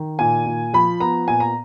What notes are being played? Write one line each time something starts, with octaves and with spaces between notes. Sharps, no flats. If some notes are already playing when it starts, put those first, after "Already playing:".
Already playing: D#3
A#2 G#5
A#2
F3 B5
B3 A#5
A#2 G#5
A#5